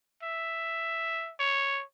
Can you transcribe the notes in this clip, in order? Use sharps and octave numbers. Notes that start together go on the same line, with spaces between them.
E5
C#5